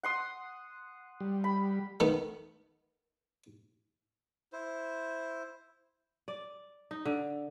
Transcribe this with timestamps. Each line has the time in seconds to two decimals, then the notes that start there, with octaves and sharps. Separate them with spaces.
0.03 F#5 C6 D#6
1.20 G3
1.44 B5
2.00 D#3 A3 B3
4.53 E4 C5
6.28 D5
6.91 D#4
7.05 D3